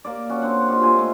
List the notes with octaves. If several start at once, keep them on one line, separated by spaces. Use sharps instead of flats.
A#3 A#4 D5
C#4 F#4
C4 D4 F#5
F4 G4 D#5
A#2 G#5 C6
A3